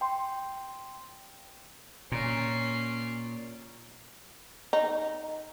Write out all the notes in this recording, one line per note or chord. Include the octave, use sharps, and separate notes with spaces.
G5 C6
A#2 C#4 C7
D#4